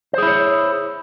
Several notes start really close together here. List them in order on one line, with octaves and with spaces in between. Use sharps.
C5 G#4 E4 C#5